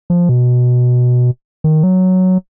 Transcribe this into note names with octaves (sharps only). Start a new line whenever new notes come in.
F3
B2
D#3
F#3